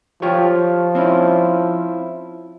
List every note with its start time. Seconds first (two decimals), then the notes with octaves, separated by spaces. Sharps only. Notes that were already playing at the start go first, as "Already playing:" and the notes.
0.22 F3 F4 G4 C#5
0.95 C4 C#4 E4